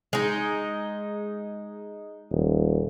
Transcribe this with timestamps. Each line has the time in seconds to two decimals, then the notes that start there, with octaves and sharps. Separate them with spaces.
0.13 G#3 D#4
2.31 D#1